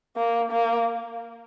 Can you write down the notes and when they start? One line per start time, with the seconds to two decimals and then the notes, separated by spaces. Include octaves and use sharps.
0.17 A#3
0.51 A#3